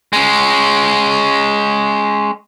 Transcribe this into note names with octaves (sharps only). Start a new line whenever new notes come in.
G#3 C#4